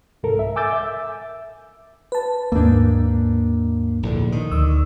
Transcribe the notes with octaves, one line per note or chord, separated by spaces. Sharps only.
C2 G#2 A4 A#4
E5
G#5 D6 E6 G6 A6
E5
B4 A5
D#2 G#2 A#3 D4
A#1 A2 D3
D#3
D2 E6